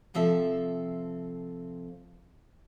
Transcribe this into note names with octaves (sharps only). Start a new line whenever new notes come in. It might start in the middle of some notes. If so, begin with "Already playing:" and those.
C3 F3 C4 A4 E5